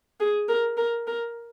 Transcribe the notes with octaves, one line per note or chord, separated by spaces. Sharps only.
G#4
A#4
A#4
A#4